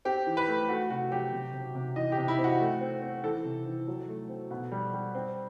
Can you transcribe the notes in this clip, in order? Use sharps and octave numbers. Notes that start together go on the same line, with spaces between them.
C4 G4
E3
B4
A3
A3 F#4
C3 F#4
F#3 G4
C3
C3
C3
E3 D#5
G4
C3
E4
C4
F#4
A3
C4
C4
E3 A4
C3
E3
F#3
A3
C4
B2
G3
G3
C4